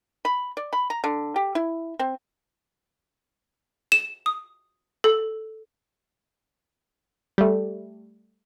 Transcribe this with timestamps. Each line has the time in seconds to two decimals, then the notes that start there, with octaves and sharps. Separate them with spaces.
0.25 B5
0.57 D5
0.73 B5
0.90 A#5
1.04 D3
1.36 G4
1.55 E4
1.99 C4
3.92 E7
4.26 D#6
5.04 A4
7.38 G3 A3